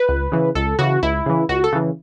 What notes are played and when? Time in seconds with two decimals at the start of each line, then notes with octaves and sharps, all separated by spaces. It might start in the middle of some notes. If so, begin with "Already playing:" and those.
Already playing: B4
0.09 C#2
0.32 C#3 E3
0.55 C#2 A4
0.79 C#3 E3 F#4
1.03 C#2 E4
1.26 C#3 E3
1.49 C#2 F#4
1.64 A4
1.73 C#3 E3